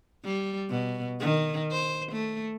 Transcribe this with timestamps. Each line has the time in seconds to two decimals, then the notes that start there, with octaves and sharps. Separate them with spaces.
0.24 G3
0.70 B2
1.20 D#3
1.72 C5
2.12 A3